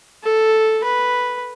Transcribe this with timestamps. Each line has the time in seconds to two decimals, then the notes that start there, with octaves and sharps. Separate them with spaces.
0.23 A4
0.84 B4